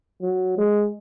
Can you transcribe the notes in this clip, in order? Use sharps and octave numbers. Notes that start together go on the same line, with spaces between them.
F#3
G#3